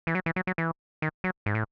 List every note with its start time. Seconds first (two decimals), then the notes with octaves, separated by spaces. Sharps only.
0.07 E3
0.15 F#3
0.26 E3
0.36 F#3
0.47 F#3
0.58 E3
1.02 D#3
1.24 F#3
1.46 G#2
1.55 A2